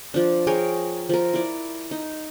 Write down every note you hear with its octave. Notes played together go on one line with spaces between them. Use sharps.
F3 D4
G#4 A#4 C#5 G5
F3 A#4
E4 D5
D#4